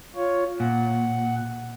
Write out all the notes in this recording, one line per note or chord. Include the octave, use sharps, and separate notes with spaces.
F4 C#5
A#2 F#5